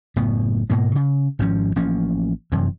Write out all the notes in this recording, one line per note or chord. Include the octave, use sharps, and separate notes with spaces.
F#1 A2 B3
G#2 B2 A#3
C#3
G#1 G#2 F3 C#4
A1 F3 A#3 C#4
F1 F#2 C3 E3